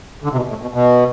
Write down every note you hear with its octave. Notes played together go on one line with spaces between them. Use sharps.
D3
C3
B2
A2
B2
B2